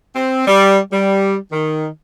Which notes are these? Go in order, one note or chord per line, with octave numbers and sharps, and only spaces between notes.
C4
G3
G3
D#3